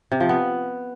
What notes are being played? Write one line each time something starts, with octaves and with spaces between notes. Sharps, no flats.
C3
F3
B3